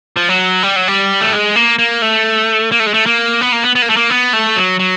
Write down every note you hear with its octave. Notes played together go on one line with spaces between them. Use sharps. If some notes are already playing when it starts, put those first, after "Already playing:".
F3
F#3
G3
F#3
G3
A3
G#3
A#3
A#3
A3
A#3
A3
G#3
A3
A#3
B3
A#3
B3
B3
A#3
A3
A#3
B3
A3
F#3
F#3